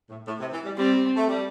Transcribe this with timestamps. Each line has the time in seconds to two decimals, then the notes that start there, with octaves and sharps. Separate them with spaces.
0.10 A2
0.27 A2
0.40 C3
0.52 E3
0.65 G3
0.78 G3 C4
1.16 A3
1.28 G3